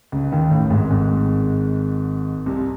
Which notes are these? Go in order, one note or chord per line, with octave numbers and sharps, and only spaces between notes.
C#2 C#3
D#2 D#3
A1 A2
G#1 G#2
G#1 G#2
C2 C3